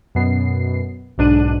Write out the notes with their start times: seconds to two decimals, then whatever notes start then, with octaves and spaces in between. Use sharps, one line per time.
0.15 F#2 B2 B3 C7
1.18 B1 G#2 B2 D4 F#6 D#7